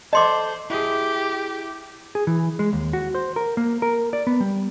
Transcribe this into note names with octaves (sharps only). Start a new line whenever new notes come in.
A4 C5 D#5 A5 C6 D6
E4 G4 G#4
G#4
E3
G#3
D#2
F#4
C5
A#4
A#3
A#4
D5
B3
G3